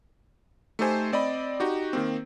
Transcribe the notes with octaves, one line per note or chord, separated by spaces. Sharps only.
A3 D#4 G4 A4 C5 G#5
C4 D5 D#5 B5
D#4 F#4 G4
D#3 A#3 C4